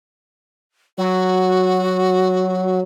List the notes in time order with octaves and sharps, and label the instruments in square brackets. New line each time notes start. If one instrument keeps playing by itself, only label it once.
[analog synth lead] F#3 [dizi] F#4